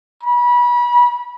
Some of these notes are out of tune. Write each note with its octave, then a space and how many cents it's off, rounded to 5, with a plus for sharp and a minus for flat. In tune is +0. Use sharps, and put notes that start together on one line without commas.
B5 -30